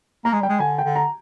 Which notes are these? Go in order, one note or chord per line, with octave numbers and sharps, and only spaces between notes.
A#3 A#5
G#3
G3 G5
G#3
D3 G#5
G5
D3
A#5